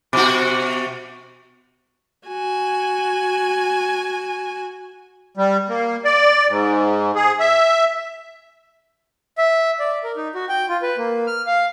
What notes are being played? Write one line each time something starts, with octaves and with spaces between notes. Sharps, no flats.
B2 F#4
F#4 G#5
G3
A#3
D5
G#2
G#4
E5
E5
D5
A#4
D#4
F#4
G5
F4
B4
A#3
F6
F5